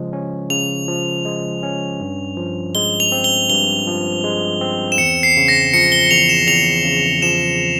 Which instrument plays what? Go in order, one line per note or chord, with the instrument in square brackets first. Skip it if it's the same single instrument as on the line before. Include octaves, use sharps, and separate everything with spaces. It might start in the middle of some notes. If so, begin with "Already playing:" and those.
Already playing: [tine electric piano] C#3 F3 G#3
C#4
[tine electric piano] C#3 [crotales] F7
[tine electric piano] F3
G#3
C#4
G2
F3
[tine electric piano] G#3 [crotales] G7
[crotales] F7
[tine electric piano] C4
[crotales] G7
[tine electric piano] G2 [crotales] G7
[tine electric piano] F3
G#3
C4
[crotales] E7
[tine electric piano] E2 [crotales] C#7
[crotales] C7
[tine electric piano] C#3
[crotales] A#6
[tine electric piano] F3 [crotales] C#7
[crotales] G7
[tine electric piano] E2 [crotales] F7
[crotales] E7
[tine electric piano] E2 [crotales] F7
[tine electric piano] C#3
[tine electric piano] F3 [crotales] E7